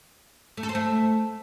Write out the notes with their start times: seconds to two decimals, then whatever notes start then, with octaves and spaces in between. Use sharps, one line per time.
0.57 A3
0.63 A4
0.69 C5
0.75 A3